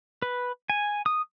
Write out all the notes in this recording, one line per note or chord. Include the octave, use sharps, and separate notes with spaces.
B4
G#5
D#6